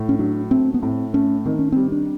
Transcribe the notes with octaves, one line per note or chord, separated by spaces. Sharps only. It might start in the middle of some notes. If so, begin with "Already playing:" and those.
Already playing: A2
C#4
F#3 D4
A3 C4
B3
A2 C4
A3 C#4
D#3 C4
C#4
G3 C4
D4